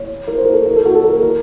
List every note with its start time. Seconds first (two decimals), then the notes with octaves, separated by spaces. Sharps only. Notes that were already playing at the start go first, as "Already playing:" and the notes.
Already playing: C#5
0.27 A#4
0.38 C5
0.45 A#4
0.52 A4
0.66 A#4
0.76 A4
0.85 F#4
0.95 A4
1.04 A#4
1.09 A4
1.23 A#4